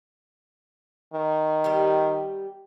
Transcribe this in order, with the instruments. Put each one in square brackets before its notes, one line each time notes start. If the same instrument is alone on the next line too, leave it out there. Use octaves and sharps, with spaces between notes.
[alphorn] D#3
[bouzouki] G3 B3 G4